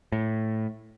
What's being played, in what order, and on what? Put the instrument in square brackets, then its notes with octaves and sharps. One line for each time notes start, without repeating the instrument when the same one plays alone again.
[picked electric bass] A2